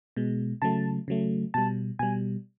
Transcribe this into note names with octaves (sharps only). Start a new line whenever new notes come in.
B2 G#3
C#3 F#3 A3 A5
C#3 F#3 A3
B2 G3 A5
B2 G3 G#5